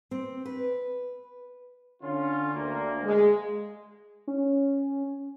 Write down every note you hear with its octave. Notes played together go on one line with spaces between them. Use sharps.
C4
B4
D3 C#4 F4
D2 A#3
G#3
C#4